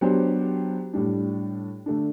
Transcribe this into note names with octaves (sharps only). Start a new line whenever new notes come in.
F#3 B3 D4 G4 C5
A2 G3 D4
D3 A3 D4